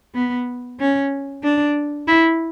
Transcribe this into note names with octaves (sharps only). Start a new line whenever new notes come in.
B3
C#4
D4
E4